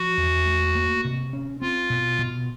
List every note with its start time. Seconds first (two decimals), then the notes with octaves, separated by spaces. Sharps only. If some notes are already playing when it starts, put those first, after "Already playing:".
Already playing: F3 F#4
0.17 E2
0.46 A3
0.75 A#3
1.04 C3
1.33 C#4
1.61 C4 F4
1.90 B2
2.19 B2